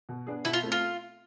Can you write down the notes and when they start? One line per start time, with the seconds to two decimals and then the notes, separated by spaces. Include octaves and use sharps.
0.09 B2
0.27 B3 D4 G#4
0.45 B2 E4
0.53 F4
0.63 A3 C4
0.72 F4